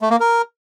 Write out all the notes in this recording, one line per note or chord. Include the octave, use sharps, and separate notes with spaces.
A3
A#3
A#4